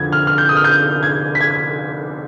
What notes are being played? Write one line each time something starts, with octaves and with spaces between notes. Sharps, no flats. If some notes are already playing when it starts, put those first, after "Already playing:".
Already playing: F2 D3 F3 G#6
F6
F6
G6
D#6
F6
G6
G#6
B6
G#6